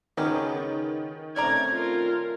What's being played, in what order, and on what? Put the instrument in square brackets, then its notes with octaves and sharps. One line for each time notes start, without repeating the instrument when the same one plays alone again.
[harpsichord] C#2 B3 G4 [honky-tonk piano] D#3 [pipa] F#3 C#4
[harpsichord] C3 A3 C#4 [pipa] C#5 D5 A#5 [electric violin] G#6
[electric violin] F4 A#4